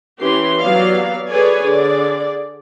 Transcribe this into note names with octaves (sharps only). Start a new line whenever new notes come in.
E3 C#4 G4 C6
F#3 B3 G4 D5 F5
G#4 A4 B4 C#5 D5 G#5
D3 G#4 D5